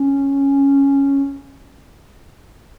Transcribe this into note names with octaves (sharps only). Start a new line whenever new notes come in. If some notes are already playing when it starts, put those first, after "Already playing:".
Already playing: C#4